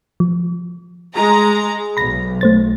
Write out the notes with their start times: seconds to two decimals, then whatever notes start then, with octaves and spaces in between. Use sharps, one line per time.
0.20 F3
1.13 G#3 A#5
1.97 B1 B5 A#6
2.41 A3 C5 A6